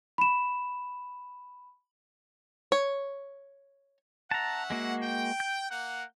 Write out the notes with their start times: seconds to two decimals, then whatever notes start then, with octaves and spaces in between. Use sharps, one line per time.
0.18 B5 E7
2.72 C#5
4.31 C#4 E5 F#5 A5 A#5
4.70 G#3 A#3 F#4
5.02 G5
5.40 G6
5.69 A#3 F#5